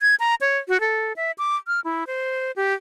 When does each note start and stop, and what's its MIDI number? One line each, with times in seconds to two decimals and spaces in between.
0.01 0.15 92
0.20 0.35 82
0.41 0.58 73
0.69 0.80 66
0.80 1.13 69
1.16 1.31 76
1.38 1.56 86
1.67 1.80 89
1.84 2.04 64
2.07 2.51 72
2.56 2.74 67